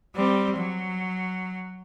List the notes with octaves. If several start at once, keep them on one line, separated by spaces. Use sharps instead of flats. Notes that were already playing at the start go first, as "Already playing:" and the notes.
G3 C4
F#3